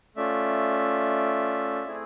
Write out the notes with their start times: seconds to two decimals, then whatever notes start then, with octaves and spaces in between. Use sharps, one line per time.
0.16 A3 C#4 F4 D5 E5
1.86 A3 C4 E4 G#4